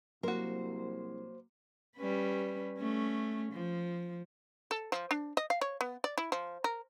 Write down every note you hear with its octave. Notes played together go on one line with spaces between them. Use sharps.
C2 F#3 A#3 F#4 A#4 C5
G3 C#4 B4
A3 C#4
F3
A4
F3
D4
D#5
F5
C#5
B3
D5
E4
F3
A#4